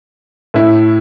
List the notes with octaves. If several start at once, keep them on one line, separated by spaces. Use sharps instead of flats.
A2 A3 E4